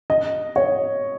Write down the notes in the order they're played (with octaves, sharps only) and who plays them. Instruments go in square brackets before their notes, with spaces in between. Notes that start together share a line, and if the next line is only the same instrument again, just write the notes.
[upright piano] D#5
C#5